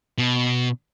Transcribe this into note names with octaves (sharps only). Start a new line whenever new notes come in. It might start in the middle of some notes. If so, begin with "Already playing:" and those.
B2